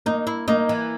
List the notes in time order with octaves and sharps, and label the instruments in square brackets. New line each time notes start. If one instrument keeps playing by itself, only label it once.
[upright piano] A#3 [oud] D#4
[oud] E4
[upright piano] A#3 [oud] D#4
[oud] E3